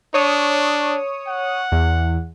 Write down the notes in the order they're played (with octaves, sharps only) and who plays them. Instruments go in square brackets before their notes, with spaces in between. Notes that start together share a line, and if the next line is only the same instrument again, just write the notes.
[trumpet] D4 [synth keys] C#5 D#6
[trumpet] F#5
[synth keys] E2